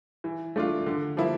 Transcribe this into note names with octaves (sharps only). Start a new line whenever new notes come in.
E3
A3 D4 F4
D3
F3 A#3 E4